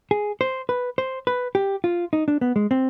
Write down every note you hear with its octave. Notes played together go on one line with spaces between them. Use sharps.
G#4
C5
B4
C5
B4
G4
F4
D#4
D4
B3
G#3
C4